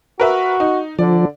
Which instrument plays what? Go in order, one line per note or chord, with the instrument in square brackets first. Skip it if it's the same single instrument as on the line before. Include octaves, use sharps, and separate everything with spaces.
[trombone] F#4 [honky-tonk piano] A#4 B4 E5
[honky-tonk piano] D#4
[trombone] D3 [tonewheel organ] F3 [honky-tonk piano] D5